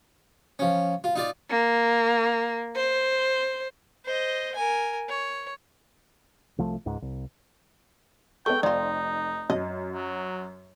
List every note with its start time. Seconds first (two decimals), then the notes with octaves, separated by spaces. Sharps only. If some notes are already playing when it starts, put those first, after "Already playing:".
0.59 F3 C#4
1.04 F4
1.16 D#4 F4 D5
1.50 A#3
2.76 C5
4.05 C5 D#5
4.55 A#4 G#5
5.09 C#5
6.58 C2 F3 A3
6.86 C#2 G#2
7.02 C2
8.46 G#3 B3 A4 G5 C#6
8.63 F1 C4 D#4 F4 D5
9.50 F#2 D#5
9.92 F#3